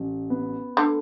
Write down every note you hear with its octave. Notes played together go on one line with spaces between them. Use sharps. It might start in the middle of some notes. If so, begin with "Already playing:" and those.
Already playing: A1
B3
D3 A3